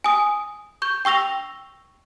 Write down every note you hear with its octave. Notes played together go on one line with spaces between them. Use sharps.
G#5 D#6
C#6 G6
G5 C#6 E6 A#6 F7